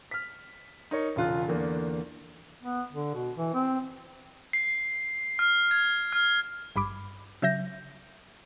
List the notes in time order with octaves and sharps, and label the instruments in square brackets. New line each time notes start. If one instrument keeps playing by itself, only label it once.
[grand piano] F6 B6
D#4 A#4 C#5
E1 C#3 F4 F#6
E2 D3 A#3
[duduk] B3
D3
B2
E3
C4
[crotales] C7
F6
G#6
F6
[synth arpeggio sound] G#1 G2 B5 D6
C#3 F#3 E5 G6 A#6